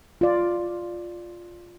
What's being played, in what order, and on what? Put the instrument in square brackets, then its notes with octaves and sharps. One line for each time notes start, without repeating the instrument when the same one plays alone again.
[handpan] F4 D5